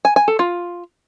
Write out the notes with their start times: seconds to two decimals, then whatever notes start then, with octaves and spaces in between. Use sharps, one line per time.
0.05 G#5
0.16 G#5
0.28 A4
0.39 F4